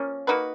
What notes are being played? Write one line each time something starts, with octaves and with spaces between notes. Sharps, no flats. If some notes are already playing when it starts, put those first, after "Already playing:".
Already playing: F3 A#3 C#4
A#3 D#4 F#4 B4